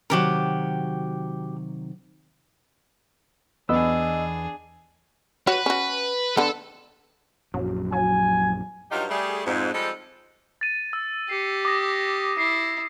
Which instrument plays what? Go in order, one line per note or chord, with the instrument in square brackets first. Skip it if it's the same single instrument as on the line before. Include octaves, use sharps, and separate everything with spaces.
[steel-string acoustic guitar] C3 D#3 F#3 [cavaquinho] F#4 G4 A#4
[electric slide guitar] E2 [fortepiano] B3 [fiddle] D4 G#4 [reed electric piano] D#5 E6
[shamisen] F#4 C#5 [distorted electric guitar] B4
[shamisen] C#4 F#4
[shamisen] D3 B3 [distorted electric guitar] A4
[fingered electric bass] A#1 F#2 [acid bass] F#3
[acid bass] F#3 [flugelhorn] G#5
[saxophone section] G2 F#3 G3 D#4 F4 G4
G3 A3 G#4
F2 G#2
F3 G3 G#3 A4
[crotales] A6 D#7
E6
[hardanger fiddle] G4 [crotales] C7 C#7
[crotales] D6 D#6 A#6
[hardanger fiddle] E4 [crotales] C7